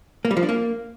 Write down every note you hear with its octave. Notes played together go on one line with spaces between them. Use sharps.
A#3
G3
F3
D4
A#3